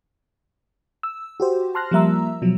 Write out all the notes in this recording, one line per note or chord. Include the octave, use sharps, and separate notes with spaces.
E6
F#4 G4 C5
A5 C6 F6 F#6 A#6
F3 G3 A#3 E5 A#5 E6
B2 F3 F#3